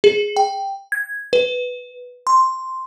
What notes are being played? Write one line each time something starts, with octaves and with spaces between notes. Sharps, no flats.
G#4
G5
G#6
B4
C6